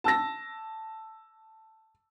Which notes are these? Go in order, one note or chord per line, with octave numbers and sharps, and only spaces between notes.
A5 E6 A#6